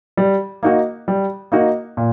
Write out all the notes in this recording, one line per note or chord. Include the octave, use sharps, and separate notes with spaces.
G3
A#3 D#4 F#4
G3
A#3 D#4 F#4
A#2